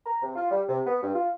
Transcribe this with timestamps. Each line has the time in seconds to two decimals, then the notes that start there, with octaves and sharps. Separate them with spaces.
0.06 A#5
0.22 C3
0.36 F4
0.51 G3
0.69 C3
0.87 B3
1.03 G2
1.14 F4